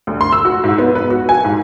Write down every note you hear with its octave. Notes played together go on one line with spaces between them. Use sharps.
D2
C6
E6
F#4
G#2
B3
B4
F#4
G#5
G#2